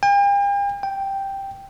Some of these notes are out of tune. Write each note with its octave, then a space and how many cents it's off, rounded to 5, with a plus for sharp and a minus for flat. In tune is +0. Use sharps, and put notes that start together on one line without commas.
G5 +45
G5 +0